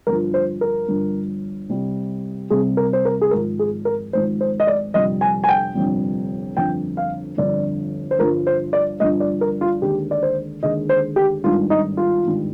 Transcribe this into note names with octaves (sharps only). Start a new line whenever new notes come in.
G1 G2 F3 A#4
C5
A#4
G1 G2 F3
C2 C3 G3
C2 C3 G3 G#4
A#4
C5
A#4
G#4
G#1 G#2 F3 A#4
G#4
A#4
G#1 G#2 F3 C5
C5
D#5
D5
G1 F2 C3 G3 D#5
G#5
G#5
G5
G1 F2 C3 G3
G1 F2 D3 F3 G5
F5
G1 F2 D3 F3 D5
C5
G1 G2 F3 A#4
C5
D5
G1 G2 F3 D#5
D5
A#4
F4
D#2 D3 G#3 G4
D5
C5
D#2 D3 G#3 D#5
C5
G4
G#1 G2 D#3 G3 F4
D#4
F4
G#1 G2 D#3 G3